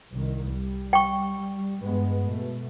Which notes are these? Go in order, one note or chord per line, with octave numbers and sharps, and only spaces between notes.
C2 D#3
G3
G5 C#6
G2 G#3 B3
B2 A3